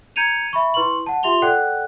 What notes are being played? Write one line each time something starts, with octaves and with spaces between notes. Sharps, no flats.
A#5 G6 G#6 C#7 D#7 F7
E5 B5 C#6
E4 B4 C6 C#6 F#7
F#5 A5
F4 G4 E5 C6 F7 G7
A4 D5 F#5 G5 F#6